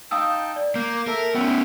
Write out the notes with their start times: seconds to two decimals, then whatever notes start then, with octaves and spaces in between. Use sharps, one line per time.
0.11 D#4 F5 G5 A5 D#6 E6
0.56 D5
0.76 A#3 D6 G6
1.08 A4 A#4 E5
1.35 B3 C#4 F#4 E5 G5